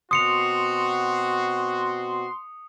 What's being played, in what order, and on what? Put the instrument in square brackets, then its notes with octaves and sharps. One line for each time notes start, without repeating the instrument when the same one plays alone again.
[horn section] B2 C4 F#4 [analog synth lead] C6 [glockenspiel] D#6 C#7 F7